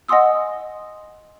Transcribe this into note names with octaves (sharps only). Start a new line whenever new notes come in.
D#5 F#5 G#5 C6 D#6 E6